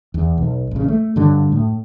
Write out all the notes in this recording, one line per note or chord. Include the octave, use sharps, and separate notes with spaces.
E2
B1
A1 C#3
A3
G2 D3 F#3
A2